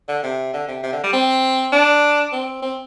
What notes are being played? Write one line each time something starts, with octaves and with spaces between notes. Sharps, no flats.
D3
C3
D3
C3
C3
D3
G3
C4
D4
C4
C4